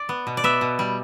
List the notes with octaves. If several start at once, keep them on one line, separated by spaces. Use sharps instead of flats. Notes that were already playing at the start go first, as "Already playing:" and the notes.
Already playing: D5
B3
B2
D5
B3 E5
B2
G3